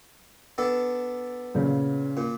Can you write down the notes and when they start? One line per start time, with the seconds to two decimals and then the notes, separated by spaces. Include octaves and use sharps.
0.58 B3 D4 A4
1.55 A#2 C#3
2.17 A#2